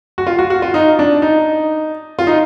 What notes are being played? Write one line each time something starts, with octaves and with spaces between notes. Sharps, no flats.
F#4
F4
F#4
F#4
F4
D#4
D4
D#4
F4
D#4